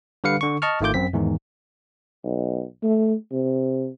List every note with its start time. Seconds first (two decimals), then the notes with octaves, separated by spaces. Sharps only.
0.24 D3 G3 B4 F5 C#7
0.41 D3 C#6
0.62 D#5 A5 C#6 F6
0.81 G#1 D#3 A3 F4 D6 G6
0.94 F#2 C4 B6
1.13 E2 G#2 D#3
2.24 B1
2.83 A3
3.31 C3